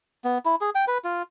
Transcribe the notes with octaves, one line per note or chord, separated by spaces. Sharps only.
B3
E4
G#4
G5
B4
F4